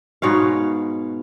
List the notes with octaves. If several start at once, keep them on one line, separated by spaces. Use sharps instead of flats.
G#2 B2 C#5 F5